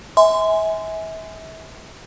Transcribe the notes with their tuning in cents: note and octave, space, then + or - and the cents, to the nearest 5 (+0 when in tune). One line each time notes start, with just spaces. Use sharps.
E5 -35 G#5 +0 C6 -25